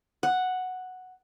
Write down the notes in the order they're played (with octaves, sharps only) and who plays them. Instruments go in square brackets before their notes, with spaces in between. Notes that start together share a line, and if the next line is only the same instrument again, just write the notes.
[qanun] F#5